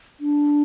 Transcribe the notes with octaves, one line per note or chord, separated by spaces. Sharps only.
D4